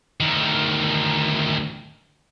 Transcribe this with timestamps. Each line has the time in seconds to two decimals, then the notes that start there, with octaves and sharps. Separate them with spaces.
0.20 D2 D#3